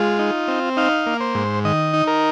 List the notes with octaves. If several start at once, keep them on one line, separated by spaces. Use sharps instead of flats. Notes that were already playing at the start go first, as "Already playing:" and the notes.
Already playing: G#3 F4
D#4
C4
D#4 F5
A#3
C5
G#2
D#3 D#5
D#4
A#4